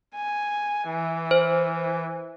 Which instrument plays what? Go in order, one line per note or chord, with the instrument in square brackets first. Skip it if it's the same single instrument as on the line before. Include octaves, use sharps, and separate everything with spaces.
[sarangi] G#5
E3
[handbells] C5